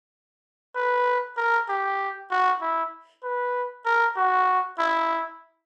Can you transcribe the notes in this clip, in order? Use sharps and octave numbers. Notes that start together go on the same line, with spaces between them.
B4
A#4
G4
F#4
E4
B4
A#4
F#4
E4